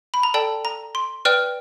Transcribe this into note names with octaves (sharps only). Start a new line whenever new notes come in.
B5
A#5
A4 D5 G5 A5
A#5
C6
B4 D5 G5 F6